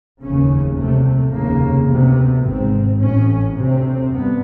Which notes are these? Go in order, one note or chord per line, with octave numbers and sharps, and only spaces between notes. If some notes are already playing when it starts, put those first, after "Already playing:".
F1 D#2 C#3 C#4
C2 C3 A3
F1 D#2 C#3 A#3
D2 C3 B3
G#1 G#2 C4
A1 A2 C#4
D2 C3 C4
G2 B3